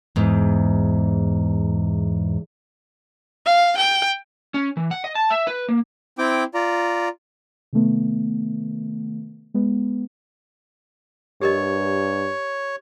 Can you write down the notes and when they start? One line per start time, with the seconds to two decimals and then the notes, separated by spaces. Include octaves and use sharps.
0.16 E2 G#2
3.45 F5
3.77 G5
4.54 C#4
4.77 E3
4.91 F#5
5.04 D#5
5.15 A5
5.31 E5
5.47 B4
5.69 A#3
6.18 C4 E4 G5 D6
6.54 F4 D5 A#5
7.73 C3 D#3 A3 B3
9.54 G#3 B3
11.41 G2 G4 A#4 C#5 D#5